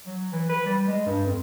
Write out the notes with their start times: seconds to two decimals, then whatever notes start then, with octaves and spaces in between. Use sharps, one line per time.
0.06 F#3
0.33 E3
0.49 B4
0.66 G3
0.88 G#3
1.06 G2
1.26 F2